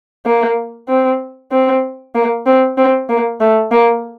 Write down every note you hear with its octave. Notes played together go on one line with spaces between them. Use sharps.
A#3
C4
C4
A#3
C4
C4
A#3
A3
A#3